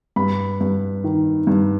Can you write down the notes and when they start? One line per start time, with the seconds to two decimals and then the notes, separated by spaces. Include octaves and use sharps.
0.16 G2 B5
0.61 G2
1.04 D#3
1.47 G2